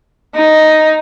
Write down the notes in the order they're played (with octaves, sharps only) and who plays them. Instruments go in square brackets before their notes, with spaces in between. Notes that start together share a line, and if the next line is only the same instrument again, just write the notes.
[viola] D#4